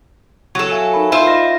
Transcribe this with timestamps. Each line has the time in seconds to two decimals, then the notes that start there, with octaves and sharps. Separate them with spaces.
0.55 F#3 A4 C#6
0.71 E5 F5 G#5
0.94 D#4 A#4 B5
1.12 F4 C5 E5
1.27 D#5 A#6